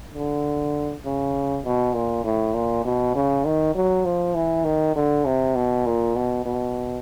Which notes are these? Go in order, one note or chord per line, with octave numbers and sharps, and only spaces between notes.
D3
C#3
B2
A#2
A2
A#2
B2
C#3
D#3
F#3
F3
E3
D#3
D3
C3
B2
A#2
B2
B2